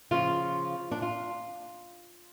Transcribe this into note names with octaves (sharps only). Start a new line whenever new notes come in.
C#3 F3 F4
D4
F4